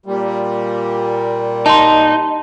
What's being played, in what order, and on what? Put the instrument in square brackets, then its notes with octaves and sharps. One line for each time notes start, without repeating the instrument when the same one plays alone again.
[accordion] A#2 G3
[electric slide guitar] D#4 [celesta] A5 C6